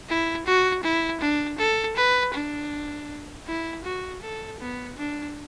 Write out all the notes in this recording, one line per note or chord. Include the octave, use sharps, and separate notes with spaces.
E4
F#4
E4
D4
A4
B4
D4
E4
F#4
A4
B3
D4